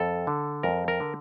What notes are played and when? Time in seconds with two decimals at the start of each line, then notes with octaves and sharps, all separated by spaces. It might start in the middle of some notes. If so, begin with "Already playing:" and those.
Already playing: F2 A4
0.27 D3
0.63 F2 A#4
0.88 A#4
1.00 D3